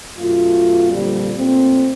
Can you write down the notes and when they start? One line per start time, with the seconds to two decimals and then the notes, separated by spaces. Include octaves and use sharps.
0.18 F#2 B2 A3 F4
0.91 F2 A#2 D3 G3
1.36 A#2 A3 C4